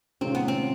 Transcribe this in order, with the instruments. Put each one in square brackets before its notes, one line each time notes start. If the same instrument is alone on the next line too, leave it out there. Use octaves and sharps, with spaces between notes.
[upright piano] C3 D#3 G#3 C#4 F4 [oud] C4
[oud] B3
C4